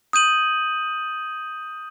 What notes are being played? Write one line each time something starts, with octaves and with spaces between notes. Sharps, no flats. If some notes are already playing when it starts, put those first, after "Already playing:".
D#6 G6 D#7 F#7